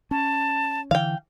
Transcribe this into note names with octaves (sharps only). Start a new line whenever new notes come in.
C#4 A5
D3 E3 F5 G5